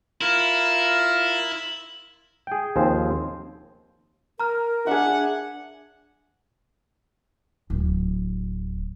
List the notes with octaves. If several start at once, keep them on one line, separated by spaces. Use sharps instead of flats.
E4 F4 A#4
G#4 G5
D#2 F3 C4 G#4 C5
A#4 A#5 F6
D4 G#4 E5 F#5
D1